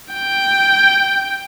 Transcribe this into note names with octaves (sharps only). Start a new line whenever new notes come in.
G5